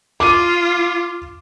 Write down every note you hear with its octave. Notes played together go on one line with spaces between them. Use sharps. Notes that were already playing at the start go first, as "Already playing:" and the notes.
F4 D6 D#7